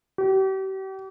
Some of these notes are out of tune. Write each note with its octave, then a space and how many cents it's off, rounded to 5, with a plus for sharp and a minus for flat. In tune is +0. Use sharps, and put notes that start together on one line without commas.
G4 -40